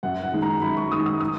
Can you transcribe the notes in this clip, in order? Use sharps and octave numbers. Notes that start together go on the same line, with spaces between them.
F#2 F#5
F#5
D#3 G#3
A#5
F#2 B5
C#6
D#3 G#3 D#6
D#6
D#6